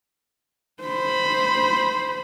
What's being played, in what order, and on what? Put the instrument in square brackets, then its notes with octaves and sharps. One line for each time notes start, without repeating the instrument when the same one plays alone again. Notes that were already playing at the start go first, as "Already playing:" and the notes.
[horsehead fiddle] C5 B5